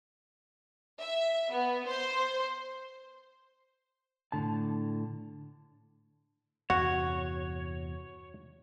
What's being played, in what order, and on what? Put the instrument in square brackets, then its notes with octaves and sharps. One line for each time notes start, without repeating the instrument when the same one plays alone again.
[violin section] E5
B3
C5
[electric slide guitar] A2 D3 A5
[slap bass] E2 G2 C3 [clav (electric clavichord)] F#4 [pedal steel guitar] C#5 [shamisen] F#5